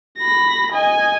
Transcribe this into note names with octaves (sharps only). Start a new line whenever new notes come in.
B5 A#6
D#5 G#5